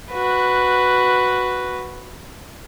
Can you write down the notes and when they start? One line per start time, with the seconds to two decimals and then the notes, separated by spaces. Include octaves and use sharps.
0.12 F#4 B4